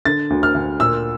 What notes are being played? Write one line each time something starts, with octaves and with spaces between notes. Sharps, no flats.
D3 A6
D2
F6
D2
A#2 E6